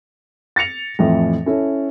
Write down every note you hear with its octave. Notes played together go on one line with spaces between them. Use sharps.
A6 A#6 C#7 F7
F2 A2 E3 F3
C#4 E4 A4